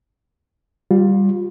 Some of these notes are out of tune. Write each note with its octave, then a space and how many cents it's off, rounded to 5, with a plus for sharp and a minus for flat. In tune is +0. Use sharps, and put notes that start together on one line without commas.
G3 +0 F4 +25